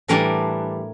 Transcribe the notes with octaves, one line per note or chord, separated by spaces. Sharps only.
A2 E3 G3 D4 A#4